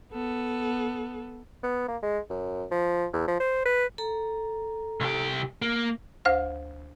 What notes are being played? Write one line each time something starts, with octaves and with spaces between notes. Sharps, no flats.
B3 A4
B3
A#3
G#3
F#2
F3
E2
F3
C5
B4
A4 A#5
C2 G4
A#3
D2 C5 F5